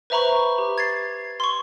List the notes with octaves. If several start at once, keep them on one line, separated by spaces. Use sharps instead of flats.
B4 C5 E5 A#5 B5 C#6
G4
G#6 A6 C7
C6 C#6